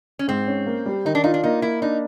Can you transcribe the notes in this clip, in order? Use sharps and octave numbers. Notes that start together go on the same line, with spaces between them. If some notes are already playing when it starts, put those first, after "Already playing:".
C#4
G#2 C4
C#4
A#3
G3
D#3 D#4
D4
D#4 F4
D4
A#3 D#4
A#3 E4
D4 D#4